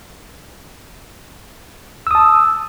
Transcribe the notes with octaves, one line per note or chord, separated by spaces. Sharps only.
A5 D#6 E6